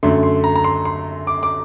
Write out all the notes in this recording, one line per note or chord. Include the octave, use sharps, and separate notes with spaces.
F#2 D3 A3 C6
C6
A#5
A#5
C6
C6
D6
D6